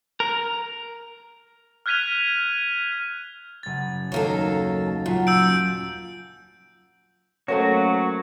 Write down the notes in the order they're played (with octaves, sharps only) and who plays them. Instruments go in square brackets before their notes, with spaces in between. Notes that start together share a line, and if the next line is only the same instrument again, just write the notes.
[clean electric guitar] A#4
[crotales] F6 F#6 G#6 B6 D#7 F7
[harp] F#1 G#6 [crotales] A6
[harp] D#2 [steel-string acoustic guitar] F#3 A#3 A4
[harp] A5
[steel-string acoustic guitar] A#2 [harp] F#3 C#4
[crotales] E6 G6 D7
[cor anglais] F#3 [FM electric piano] A3 A#3 C#4 [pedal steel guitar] F#4 [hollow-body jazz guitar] A4 C5 C#5